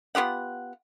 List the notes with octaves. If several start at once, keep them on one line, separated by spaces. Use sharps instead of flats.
B3 F4 G4 F#5